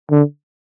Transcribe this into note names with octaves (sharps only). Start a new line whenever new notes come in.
D3